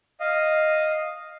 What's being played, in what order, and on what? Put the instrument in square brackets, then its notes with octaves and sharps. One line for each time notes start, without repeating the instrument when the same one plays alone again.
[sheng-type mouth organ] D#5 F5